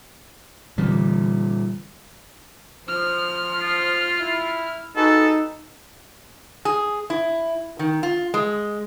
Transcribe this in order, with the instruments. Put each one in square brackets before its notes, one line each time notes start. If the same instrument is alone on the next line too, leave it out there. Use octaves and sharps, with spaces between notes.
[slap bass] A#2 G3 [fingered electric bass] D3 E3 C4
[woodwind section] F3 [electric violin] F6
[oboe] F4
[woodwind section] E4
[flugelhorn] D#4 [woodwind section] F#4 G#4 B4 [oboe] A4
[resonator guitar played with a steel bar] G#4
E4
D#3
F4
G#3